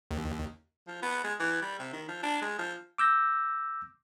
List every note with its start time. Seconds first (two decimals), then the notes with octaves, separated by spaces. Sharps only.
0.11 D#2
0.88 F3
1.03 B3
1.25 G#3
1.40 E3
1.62 G3
1.80 C3
1.93 D#3
2.09 F3
2.23 D4
2.42 G#3
2.59 F3
2.98 D6 E6 G6 A#6